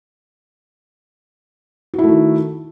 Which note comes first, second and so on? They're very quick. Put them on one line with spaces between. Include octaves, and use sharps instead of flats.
F#4 E4 A3 D#3